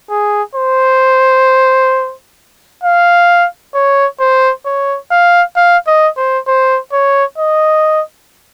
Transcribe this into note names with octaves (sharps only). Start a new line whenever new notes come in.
G#4
C5
F5
C#5
C5
C#5
F5
F5
D#5
C5
C5
C#5
D#5